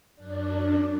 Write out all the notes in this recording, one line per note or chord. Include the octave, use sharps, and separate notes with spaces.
F#2 D4